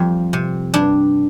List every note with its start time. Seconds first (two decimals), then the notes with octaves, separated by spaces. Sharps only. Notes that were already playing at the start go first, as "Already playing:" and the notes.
Already playing: F2 G3 G4
0.33 C3
0.74 G2 D4